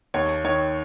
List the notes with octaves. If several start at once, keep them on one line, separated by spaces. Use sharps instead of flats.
D#2 C#5
D#3 C#5